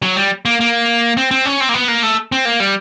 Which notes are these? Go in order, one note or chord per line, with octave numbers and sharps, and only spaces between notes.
F#3
G3
A#3
A#3
C4
C4
C#4
C4
A#3
B3
A#3
A3
C4
A#3
G3